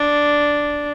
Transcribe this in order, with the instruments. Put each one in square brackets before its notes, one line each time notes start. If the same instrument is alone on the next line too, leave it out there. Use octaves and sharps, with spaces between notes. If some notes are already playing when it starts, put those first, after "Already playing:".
Already playing: [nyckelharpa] D4